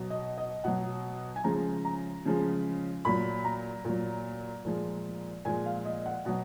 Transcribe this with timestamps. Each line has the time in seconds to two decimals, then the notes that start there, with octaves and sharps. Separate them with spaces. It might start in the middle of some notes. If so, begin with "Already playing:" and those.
Already playing: B2 F#3
0.10 D#5
0.38 D#5
0.64 B2 F#3 F#5
1.36 G#5
1.44 C#3 F3 G#3 A#5
1.85 A#5
2.25 C#3 F3 G#3
3.05 A#2 F#3 B5
3.45 A#5
3.85 A#2 F#3
4.65 A#2 F3 G#3
5.45 A#2 F3 G#3 G#5
5.66 F5
5.85 D#5
6.06 F#5
6.25 B2 F#3 F#5